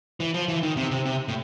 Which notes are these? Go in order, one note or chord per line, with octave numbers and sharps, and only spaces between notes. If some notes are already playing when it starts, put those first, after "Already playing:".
E3
F3
E3
D#3
C3
C3
C3
A2